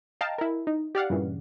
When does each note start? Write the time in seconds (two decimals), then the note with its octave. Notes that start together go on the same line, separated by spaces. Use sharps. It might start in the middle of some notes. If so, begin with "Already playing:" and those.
0.21 D#5 F5 G5 A5 A#5
0.38 E4 A#4
0.67 D#4
0.95 G4 D5 F5 F#5
1.10 G2 A#2 C#3 E3